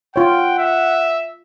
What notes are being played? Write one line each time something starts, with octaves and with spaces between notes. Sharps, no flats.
F4 C#5 F#5 G5
E5